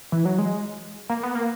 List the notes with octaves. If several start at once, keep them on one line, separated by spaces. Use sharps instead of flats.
E3
F#3
G#3
A#3
B3
A#3